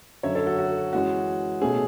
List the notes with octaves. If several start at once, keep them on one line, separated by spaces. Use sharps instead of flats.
F#2 D3 F#3 C#5 E5
A4 C#5
F#4 A4
F#4
F#2 E3 G#3 C#4 F#4
B2 A3 C#4 G#4